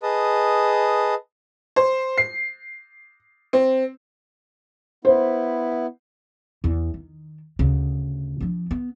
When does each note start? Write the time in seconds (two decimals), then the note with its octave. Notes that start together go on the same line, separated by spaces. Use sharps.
0.03 G#4 B4 D#5 A5 D#6
1.76 C5
2.18 C7
3.53 C4
5.05 B3 E4 C5
6.64 E2
6.94 D#3
7.59 D2 C#3
8.41 F3 D4
8.71 B3